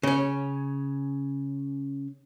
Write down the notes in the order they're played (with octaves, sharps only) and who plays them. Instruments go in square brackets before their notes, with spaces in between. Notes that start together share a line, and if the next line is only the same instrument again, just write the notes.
[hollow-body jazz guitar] C#3 C#4